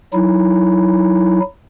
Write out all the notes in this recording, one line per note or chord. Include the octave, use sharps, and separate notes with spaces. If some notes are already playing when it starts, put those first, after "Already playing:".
F#3 D#4 E4